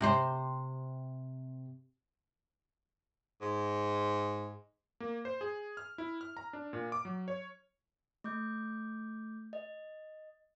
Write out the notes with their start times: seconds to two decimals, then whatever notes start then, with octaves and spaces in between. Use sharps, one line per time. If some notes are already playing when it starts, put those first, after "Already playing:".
0.01 C3 G4 C5
3.42 G#2
5.00 A#3
5.25 C5
5.41 G#4
5.77 F6
5.98 E4
6.21 F6
6.37 A#5
6.53 D4
6.73 A#2
6.92 D6
7.05 F#3
7.28 C#5
8.24 A3 D6 G6
9.53 D#5